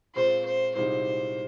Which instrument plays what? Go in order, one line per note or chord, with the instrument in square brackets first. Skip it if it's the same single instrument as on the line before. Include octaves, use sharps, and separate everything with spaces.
[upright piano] A#2 G#3 C4 F4 [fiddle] C5
[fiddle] C5
[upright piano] C2 A#2 G#3 D#4 G4 [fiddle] C5